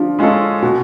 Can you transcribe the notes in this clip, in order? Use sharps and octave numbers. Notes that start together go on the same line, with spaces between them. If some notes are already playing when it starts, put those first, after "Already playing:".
Already playing: F3 D4
G#3 C#4 F4 A4
B2 F#4